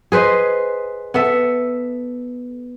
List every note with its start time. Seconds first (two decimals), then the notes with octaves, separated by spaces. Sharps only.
0.12 G#4 B4 C5 D#5
1.14 B3 A4 E5